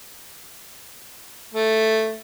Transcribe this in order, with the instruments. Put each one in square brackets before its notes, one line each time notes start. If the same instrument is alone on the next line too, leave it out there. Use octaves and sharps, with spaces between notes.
[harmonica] A3